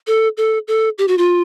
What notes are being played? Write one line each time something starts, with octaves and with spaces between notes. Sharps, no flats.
A4
A4
A4
G4
F#4
F4